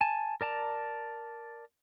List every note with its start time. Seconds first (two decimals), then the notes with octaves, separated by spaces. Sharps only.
0.01 G#5 A5
0.41 A#4 D5 A5 A#5